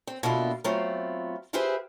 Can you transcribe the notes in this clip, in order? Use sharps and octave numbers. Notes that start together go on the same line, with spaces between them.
C4
B2 D3 A#3 E4 F4
F#3 A3 B3 C4 F4
E4 F4 G4 G#4 B4 C5